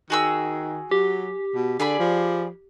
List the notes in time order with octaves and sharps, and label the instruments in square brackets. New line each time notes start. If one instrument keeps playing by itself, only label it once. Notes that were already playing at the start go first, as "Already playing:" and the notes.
[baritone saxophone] D#3 [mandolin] F#4 G#4 E6
[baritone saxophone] F#3 [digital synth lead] G4
[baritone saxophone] B2
[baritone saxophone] D3 [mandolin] G#4 D5 B5
[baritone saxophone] F3